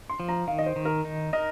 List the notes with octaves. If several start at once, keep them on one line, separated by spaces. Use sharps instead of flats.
C6
F3
A#5
D#3 F5
D#5
C5
D#3
A#4
D#4
A#4 D#5